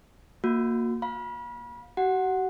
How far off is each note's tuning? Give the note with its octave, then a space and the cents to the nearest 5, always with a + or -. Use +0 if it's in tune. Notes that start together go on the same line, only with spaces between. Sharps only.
A#3 +0 F#4 -35
F5 +30 B5 -35
F#4 +45 F#5 +0